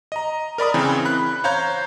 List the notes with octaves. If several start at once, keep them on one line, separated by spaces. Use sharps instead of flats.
D#5 A#5
A#4 D5 B5 D#6
C#3 E3 C4
B5 F#6
C5 C#5 F5 A#5 G6